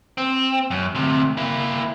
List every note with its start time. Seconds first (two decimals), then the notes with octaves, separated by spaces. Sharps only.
0.18 C4
0.71 F#2
0.95 D2 C3
1.37 A#3 E4